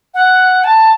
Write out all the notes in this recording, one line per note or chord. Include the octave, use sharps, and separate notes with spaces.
F#5
A5